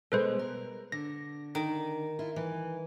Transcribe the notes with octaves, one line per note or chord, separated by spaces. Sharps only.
B2 G#3 A4 B4 C5
A#4
D3 A#6
D#3
E4 F4
E3